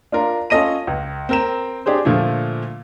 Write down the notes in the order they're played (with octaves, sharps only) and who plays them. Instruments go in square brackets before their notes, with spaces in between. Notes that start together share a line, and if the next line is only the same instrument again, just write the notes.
[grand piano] D4 F4 A#4
C#4 F4 A4 D#5 A#6 D#7
C#2
C4 A#4 E7
D4 G4 G#4 C5
A#2 D3 F3 A3